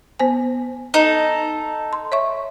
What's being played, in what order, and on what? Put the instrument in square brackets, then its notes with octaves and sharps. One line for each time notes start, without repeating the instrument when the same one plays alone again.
[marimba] B3 C5 G#5
[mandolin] D#4 A4
[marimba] C6
C#5 E5 C#6